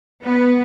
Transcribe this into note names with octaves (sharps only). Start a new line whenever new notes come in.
B3